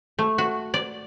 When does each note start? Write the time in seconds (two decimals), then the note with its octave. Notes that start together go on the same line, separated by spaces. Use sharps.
0.19 A3
0.38 F#4
0.74 D5